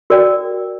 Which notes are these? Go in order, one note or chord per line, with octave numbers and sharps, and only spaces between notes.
F#4 A#4 D5 G5